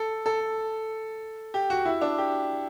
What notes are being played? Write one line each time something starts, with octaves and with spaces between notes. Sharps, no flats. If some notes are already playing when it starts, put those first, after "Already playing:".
Already playing: A4
A4
G4
F#4
E4
D4
G4